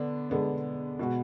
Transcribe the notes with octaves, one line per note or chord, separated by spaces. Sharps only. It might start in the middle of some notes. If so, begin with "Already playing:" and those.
Already playing: D3 B3 D4
D3 G#3 B3 D4
B2 G#3 B3 F#4